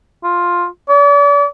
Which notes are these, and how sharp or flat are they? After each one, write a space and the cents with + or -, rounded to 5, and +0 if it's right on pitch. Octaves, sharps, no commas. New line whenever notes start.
F4 +5
D5 -40